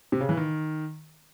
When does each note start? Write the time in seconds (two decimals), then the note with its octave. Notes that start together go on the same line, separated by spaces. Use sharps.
0.12 C3
0.21 C#3
0.29 E3
0.37 D#3